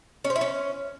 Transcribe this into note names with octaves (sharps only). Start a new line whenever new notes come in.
C#4
C5
E4
C#4